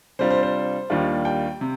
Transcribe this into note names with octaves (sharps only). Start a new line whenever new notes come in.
C3 G3 D4 F4 C5
C5
C5
D#2 D#3 G3 D4 F4
G5
C3